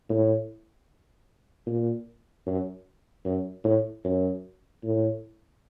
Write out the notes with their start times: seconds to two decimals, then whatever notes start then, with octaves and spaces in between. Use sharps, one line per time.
0.10 A2
1.66 A#2
2.47 F#2
3.25 F#2
3.64 A2
4.04 F#2
4.84 A2